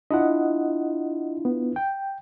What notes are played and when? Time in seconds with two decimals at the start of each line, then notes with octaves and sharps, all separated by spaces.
0.11 D4 E4 F4 D#5 F#5
1.45 B3
1.76 G5